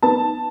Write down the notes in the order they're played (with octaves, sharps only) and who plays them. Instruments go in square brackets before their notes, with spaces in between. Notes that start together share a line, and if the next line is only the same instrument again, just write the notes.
[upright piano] B3 A5